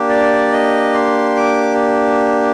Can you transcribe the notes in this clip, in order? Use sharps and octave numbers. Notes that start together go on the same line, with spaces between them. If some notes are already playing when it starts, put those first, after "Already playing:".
Already playing: A#3 D4 G4
D5
D#5
C6
D6